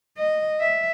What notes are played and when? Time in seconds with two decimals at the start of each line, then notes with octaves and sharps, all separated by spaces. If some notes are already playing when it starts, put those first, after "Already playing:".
0.18 D#5
0.61 E5